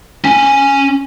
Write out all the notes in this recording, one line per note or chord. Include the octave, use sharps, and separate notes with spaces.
C#4 G#5